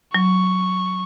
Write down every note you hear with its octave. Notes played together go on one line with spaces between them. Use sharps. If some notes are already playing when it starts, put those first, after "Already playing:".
F#3 C#6